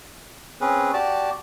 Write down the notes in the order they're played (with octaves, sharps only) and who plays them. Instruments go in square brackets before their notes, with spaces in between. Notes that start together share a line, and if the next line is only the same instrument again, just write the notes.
[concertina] C4 C#4 G#4 B4
F#4 G4 D5 A5